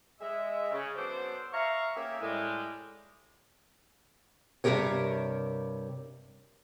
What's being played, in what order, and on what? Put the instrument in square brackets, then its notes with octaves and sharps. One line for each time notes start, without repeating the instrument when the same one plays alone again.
[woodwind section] G#3 E5
C#3
F#3 B3 D4 A4 C5
E5 F5 A#5 C#6
A#3 C#4 G4 G#4 E5
A2 G3 G#3
[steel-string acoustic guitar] G2 C3 F4 G4 A#4 C#5